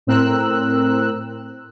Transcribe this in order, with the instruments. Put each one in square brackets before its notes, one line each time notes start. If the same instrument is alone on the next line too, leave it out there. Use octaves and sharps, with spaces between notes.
[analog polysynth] A2 C4 A#4 E6 F#6